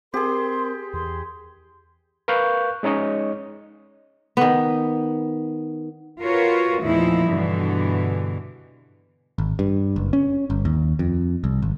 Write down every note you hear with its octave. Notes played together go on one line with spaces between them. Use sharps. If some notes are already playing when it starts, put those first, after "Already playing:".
C4 G4 G#4 A#4 C6
E2 C6
A#4 B4 F5 C#6 F#6 G6
G#3 C#4 D#4 C#5 D#5
D#3 B3
F4 F#4 A#4 B4 C#5
E2 A#2 F3 A3 D#4 E4
G2 B2 D3 E3
G#1
G2
F#1
C#4
G1
D#2
F2
C2
G#1